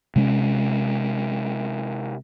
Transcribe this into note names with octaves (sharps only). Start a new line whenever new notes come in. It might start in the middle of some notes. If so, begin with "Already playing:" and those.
C3 G#3 A#3 C#4